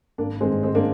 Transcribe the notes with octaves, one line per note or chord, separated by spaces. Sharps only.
G#1 A#3 D4
G2 D#3 G#3 C4
G#1 G#3 C4
A#3 D4